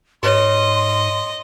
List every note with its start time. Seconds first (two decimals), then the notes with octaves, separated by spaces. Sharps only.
0.23 G#2 G4 B4 C#5 D#5 C6